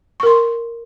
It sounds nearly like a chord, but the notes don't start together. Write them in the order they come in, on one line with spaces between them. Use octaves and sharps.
C#6 A#4 C6